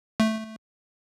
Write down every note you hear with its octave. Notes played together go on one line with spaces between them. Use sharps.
A3